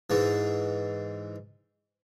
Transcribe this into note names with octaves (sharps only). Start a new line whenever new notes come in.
G#2 E3